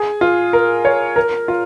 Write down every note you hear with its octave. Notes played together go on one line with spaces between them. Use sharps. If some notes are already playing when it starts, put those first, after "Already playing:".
Already playing: G#4
F4
A#4
C#5
A#4
F4